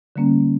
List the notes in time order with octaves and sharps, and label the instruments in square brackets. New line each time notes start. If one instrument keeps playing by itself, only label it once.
[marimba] D3 G3 A#3 C#4